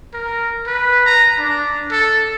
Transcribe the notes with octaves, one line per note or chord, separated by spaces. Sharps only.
A#4
B4
A#5
D4
A4